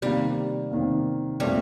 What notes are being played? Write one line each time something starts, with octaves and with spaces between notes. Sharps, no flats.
C3 D#3 G3 A#3
C3 D#3 A#3
A#2 G3 A3 C4